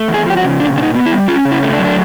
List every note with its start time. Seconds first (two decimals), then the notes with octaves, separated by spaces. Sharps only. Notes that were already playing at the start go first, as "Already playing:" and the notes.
Already playing: A3
0.08 E2
0.14 G#4
0.26 F3 G4
0.37 F#4
0.43 C#3
0.59 A#2 D4
0.76 A#2 D4
0.83 D#4
0.94 B3
1.06 E4
1.12 G3
1.28 C#4 F4
1.45 C#3
1.51 E4
1.63 A3
1.73 D4
1.79 F#3
1.84 D4